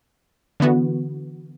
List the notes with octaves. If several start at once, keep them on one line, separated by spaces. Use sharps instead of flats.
D3 E3 B3 F#4